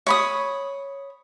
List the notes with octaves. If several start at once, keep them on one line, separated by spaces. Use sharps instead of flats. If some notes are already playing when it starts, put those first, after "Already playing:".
C#5 B5 D#6